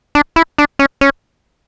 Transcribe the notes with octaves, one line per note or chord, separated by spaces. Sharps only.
D4
E4
D4
C#4
C#4